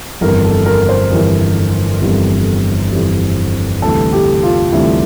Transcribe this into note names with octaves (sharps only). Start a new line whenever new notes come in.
G1 F2 E3 G3 A#4
A4
A#4
C5
G1 F2 E3 G3 A#4
G1 F2 E3 G3
G1 F2 E3 G3
D2 C3 E3 G3 A4
G4
F4
D2 C3 E3 G3 E4